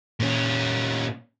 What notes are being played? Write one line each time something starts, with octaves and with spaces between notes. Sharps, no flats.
A#2 C#4